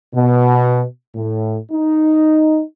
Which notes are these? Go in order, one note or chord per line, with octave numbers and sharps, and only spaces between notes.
B2
A2
D#4